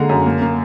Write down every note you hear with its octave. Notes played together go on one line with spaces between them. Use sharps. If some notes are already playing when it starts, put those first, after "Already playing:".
Already playing: D3 G#3 A#3 A#5
F#2
A#3
A#3